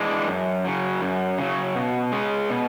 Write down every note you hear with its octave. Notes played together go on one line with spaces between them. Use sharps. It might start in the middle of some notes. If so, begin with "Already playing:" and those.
Already playing: E3 G#3 D4
F#2
C#3 F#3
F#2
C#3 F#3
B2
G#3 C#4 G#4
B2